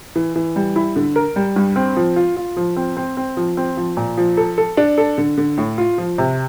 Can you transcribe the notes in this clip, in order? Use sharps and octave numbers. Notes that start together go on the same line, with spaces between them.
E3
E3
G3
E4
D3
A#4
G3
G2
C4
F3
F4
F4
F3
C4
C4
C4
F3
C4
F3
A#2
F3
A4
A4
D4
A4
D3
D3
A2
F4
F3
C3